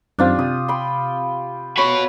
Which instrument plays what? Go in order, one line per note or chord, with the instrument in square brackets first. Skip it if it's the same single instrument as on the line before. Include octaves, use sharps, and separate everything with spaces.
[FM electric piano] F#2 D#3 C4 [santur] D4 F4 G4
[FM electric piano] C3 [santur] D#6
[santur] G5 B5 C6
[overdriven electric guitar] F#4 B5 [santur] C#5